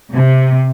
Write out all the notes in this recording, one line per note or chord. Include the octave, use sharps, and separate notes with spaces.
C3